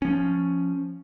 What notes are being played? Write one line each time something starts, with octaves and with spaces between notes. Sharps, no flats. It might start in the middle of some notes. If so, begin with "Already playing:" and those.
F3 C#4